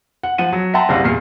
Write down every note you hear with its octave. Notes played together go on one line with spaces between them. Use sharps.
F#5
F3 F#5 D#7
F#3
E5 F#5 G5 A5 A#5 C6
F#1 C2 C3 F5 F#5 A#6
E2 A#2 F6 C7